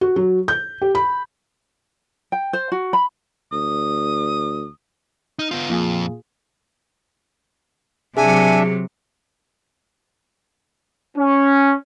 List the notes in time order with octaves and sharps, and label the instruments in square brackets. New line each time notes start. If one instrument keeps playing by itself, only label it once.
[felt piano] F#4
F#3
G6
G4
B5
[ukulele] G5
C5
F#4
B5
[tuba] D2 [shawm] D#6
[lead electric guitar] D#4 [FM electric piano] F6 G6
[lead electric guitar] B3 F4
[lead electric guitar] F2 [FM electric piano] A#2 F4 G#4
[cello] C3 F#3 [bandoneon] D4 E5 [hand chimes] G#4 [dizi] G#5
[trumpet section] C#4